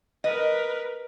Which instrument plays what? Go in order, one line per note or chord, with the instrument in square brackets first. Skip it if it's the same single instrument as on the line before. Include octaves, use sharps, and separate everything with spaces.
[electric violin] A#4 B4 [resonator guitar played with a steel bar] D#5